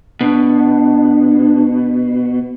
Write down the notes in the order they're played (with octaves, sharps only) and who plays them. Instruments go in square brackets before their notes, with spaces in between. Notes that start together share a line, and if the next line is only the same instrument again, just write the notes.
[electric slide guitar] B2 [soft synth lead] D4